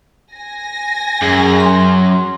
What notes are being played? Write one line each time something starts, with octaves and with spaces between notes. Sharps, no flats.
G#5 A#6
F#2 G#4
C6